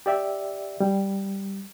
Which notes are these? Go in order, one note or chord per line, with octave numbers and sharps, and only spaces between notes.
G4 D5 E5
G3